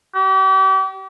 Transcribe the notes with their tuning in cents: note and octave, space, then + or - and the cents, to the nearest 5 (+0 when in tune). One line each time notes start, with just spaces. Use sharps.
G4 -40